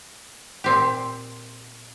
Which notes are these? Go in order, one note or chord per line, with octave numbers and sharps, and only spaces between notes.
A#2 C4 G4